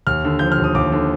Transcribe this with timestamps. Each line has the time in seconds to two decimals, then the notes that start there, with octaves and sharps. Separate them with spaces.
0.07 D#2 F6
0.24 D3
0.39 F3 G6
0.52 F6
0.58 D#2
0.64 D#6
0.74 D#2 D6
0.92 D3